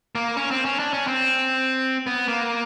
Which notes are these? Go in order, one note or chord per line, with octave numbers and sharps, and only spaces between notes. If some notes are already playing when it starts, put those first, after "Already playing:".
A#3
C#4
C4
C#4
D4
C#4
C4
B3
A#3